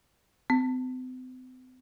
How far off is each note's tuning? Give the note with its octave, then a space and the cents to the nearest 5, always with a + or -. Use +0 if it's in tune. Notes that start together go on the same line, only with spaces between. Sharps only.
C4 -45